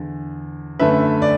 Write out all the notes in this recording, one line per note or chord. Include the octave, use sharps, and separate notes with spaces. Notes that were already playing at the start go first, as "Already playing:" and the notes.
Already playing: E2 D3
F#2 D3 A3 B4 E5
D5